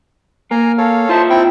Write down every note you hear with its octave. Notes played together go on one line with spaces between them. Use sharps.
A#3 G#5 A#5
A4 C#5 F5
F4 C5 E5 A5 A#5
C4 E4 G5